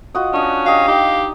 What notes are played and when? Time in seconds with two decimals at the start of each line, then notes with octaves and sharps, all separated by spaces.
0.15 F4 F#4 D#5
0.33 C#4 D4 D#5
0.66 G4 D#5 F5
0.88 D#4 G4 D#5